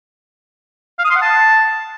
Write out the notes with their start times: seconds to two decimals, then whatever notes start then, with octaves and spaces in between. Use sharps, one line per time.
0.99 F5
1.05 D#6
1.10 C6
1.16 F#5
1.22 A5